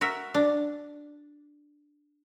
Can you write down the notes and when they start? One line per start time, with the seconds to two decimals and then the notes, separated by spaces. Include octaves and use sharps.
0.01 F#4 A#4 E5
0.34 D4